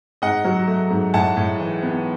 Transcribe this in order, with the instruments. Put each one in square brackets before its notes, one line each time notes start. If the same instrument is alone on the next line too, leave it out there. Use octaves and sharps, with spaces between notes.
[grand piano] G#2 D#5 F#5
F#3
A3
G#2
A2 F#5 A5
A2
E3
B3